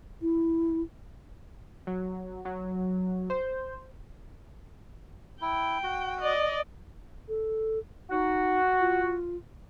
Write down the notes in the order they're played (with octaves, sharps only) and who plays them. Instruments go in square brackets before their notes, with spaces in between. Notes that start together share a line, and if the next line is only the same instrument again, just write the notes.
[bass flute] E4
[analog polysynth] F#3
F#3
C5
[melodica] E4 [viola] G5
[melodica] F#4
[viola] D5 D#5
[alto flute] A4
[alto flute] D#4 [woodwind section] F#4
[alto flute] F4